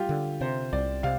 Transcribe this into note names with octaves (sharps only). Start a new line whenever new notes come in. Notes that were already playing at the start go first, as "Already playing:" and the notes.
Already playing: G3 F4 G4
D3
C3 C5
C2 D5
C3 F5